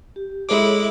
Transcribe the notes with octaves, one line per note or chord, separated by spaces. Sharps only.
G4
G#3 E4 G#4 A4 C#5 D6